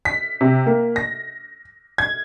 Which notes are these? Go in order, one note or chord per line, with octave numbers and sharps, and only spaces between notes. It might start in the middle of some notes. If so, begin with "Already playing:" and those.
B6
C3
A#3
A#6
G#6